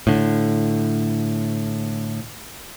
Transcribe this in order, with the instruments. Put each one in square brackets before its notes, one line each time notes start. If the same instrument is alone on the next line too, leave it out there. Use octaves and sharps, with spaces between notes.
[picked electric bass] A2 D3